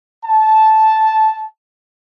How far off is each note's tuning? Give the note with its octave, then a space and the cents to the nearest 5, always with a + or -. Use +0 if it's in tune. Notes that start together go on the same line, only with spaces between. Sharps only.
A5 -10